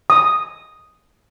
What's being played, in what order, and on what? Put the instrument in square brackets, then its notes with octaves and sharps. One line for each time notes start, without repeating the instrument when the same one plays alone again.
[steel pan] D#6